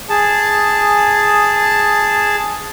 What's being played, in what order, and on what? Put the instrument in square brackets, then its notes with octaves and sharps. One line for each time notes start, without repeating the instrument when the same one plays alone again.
[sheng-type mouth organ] G#4 A5